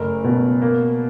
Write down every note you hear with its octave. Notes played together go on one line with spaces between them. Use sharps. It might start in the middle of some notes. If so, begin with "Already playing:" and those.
Already playing: F#1 A3 A#4
B2
A#3